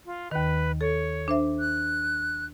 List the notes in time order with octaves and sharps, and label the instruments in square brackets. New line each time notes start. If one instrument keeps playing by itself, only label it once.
[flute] F4
[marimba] D#2 D#3 [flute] B4
[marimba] A4 [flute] C#5
[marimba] D4 C5 E5
[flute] F#6